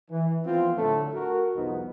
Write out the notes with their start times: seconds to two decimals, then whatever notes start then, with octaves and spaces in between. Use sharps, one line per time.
0.10 E3
0.46 E3 F3 A3 B3 C4 F4
0.77 A2 D3 F#3 A3
1.14 F#4 A#4
1.55 C2 F2 B3 D#4